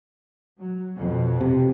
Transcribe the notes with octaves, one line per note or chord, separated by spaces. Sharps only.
F#3
F2 B2
C3